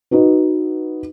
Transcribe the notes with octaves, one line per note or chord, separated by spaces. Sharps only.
D#4 F#4 B4